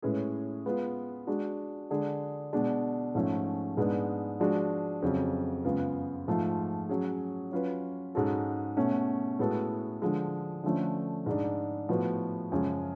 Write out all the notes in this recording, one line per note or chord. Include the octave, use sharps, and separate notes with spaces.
A2 G#3 C#4 G#4 B4
G#3 B3 F4 B4
G#3 D4 F#4
D3 G#3 D4 G#4
B2 G#3 D4
G#2 F3 A3 C#4
G#2 G#3 B3 D4
F3 G#3 D4 F#4
F2 C#3 F#3
F#2 C#3 G#3 B3 F4
G#2 F3 A3 F4
F#3 C#4 G#4
F#3 C#4 F4 B4
G#2 G#3 C#4 F#4 A4
B2 A3 C#4
A2 G#3 B3 F#4 A4
D3 F3 G#3
D3 F3 A3 C#4
G#2 G#3 D4
A2 F3 B3 F#4
F#2 C#3 F3 G#3 C#4